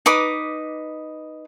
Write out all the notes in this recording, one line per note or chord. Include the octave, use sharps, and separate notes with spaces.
D#4 B4 D6 D#6